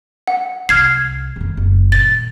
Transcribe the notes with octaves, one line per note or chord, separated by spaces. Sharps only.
F#5
C2 F6 G#6 C7
F2 D#3
F#1
A#2 D#3 A6